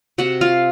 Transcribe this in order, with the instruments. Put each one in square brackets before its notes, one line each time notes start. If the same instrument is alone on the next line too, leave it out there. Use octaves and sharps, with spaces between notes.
[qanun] C3 F#4 F#5
F4 F5